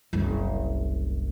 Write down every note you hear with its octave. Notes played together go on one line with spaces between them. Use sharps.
F#1 C2